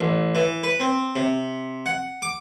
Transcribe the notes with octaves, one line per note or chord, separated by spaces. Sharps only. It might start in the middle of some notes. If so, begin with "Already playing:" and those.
A1
E3
B4
C4
C3
F#5
D6